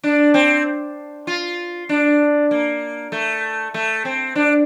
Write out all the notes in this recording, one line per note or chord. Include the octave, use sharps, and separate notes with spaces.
D4
C4
F4
D4
A#3
A3
A3
C4
D4